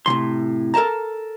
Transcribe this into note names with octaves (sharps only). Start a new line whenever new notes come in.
A2 C3 D#3 C6
A4 A#4 D#5 A5 A#5